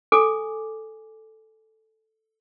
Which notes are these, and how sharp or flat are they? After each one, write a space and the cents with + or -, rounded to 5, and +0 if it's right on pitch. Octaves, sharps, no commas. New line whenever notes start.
A4 +0 G#5 +0 D6 +0